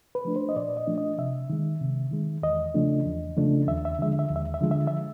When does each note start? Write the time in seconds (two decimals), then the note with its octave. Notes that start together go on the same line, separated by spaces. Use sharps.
0.15 B4
0.25 F3 A3 D4
0.36 C5
0.49 D#5
0.56 A#2 D5
0.77 D#5
0.87 F3 A3 D4
0.98 D#5
1.18 C3 E5
1.50 D#3 G#3
1.81 C3
2.11 D#3 G#3
2.43 E2 D#5
2.75 C#3 F3 A3 D4
3.05 E2
3.37 C#3 F3 A3 D4
3.67 D#2 E5
3.85 E5
3.99 D3 F3 G#3 E5
4.19 E5
4.30 D#2
4.36 E5
4.54 E5
4.61 D3 F3 G#3
4.71 E5
4.87 E5